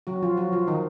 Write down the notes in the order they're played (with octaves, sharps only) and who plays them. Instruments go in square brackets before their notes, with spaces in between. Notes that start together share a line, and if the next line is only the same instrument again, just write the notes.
[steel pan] F#3 F#4
F3 F4
F#3 F#4
F3 F4
D#3 D#4